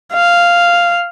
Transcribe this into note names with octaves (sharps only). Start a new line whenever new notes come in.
F5